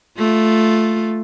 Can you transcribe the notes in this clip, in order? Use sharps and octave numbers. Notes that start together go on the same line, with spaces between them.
A3 F4